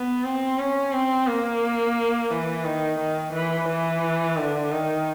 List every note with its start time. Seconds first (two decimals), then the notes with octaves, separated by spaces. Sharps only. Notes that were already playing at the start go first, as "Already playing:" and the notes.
Already playing: B3
0.24 C4
0.59 C#4
0.93 C4
1.27 A#3
2.31 E3
2.65 D#3
2.99 D#3
3.33 E3
3.68 E3
4.37 D3
4.71 D#3